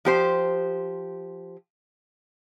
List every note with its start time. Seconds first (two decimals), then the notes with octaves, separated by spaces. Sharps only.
0.05 F3 G4 C5